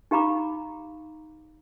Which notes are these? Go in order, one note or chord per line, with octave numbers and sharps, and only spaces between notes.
D#4 G4 F5 A#5 B5 D6